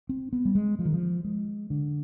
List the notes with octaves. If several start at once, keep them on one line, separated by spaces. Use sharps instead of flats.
C4
B3
G3
G#3
F3
D#3
F3
G#3
D3